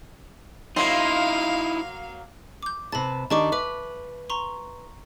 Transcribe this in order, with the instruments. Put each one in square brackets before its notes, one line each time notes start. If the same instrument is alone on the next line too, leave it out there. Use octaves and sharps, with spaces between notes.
[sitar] F#3 A#3 [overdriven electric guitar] D#4 E4 [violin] F5 [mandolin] C6
[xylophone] D6 G6
[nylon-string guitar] C3 B4 A5 [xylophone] B5 A6
[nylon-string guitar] D#3 D4 G4 [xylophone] A5 C#6 D6
[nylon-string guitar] B4 [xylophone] E5 D6
[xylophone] A#5 C6 C#6